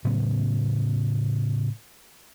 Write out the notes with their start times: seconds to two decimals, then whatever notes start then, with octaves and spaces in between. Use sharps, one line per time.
0.04 A2 C#3 F#3 B3